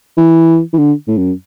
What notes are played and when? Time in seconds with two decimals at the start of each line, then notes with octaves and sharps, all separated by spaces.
0.17 E3
0.73 E3
0.78 D3
1.07 A2
1.18 F#2